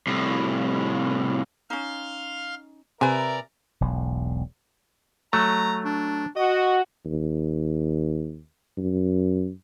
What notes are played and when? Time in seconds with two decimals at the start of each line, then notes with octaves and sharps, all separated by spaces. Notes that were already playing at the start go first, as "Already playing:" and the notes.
0.07 C2 A2
1.70 C#4 D#4 F5 C6 F6
3.01 C3 A#4 B4 D5 E5 G#5 A#5
3.81 E1 B1 E2
5.33 F#3 A3 A#5
5.85 D4
6.36 F#4 D#5
7.06 D#2
8.78 F#2